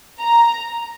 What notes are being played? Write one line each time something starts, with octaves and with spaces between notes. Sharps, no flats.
A#5